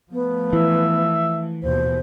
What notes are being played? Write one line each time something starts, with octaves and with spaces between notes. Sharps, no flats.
F3 A3 B3
E3 E5
D#2 B2 C5